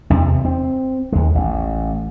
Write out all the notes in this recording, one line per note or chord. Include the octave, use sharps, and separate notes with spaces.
E2 C3
C4
D#2 G#3
A1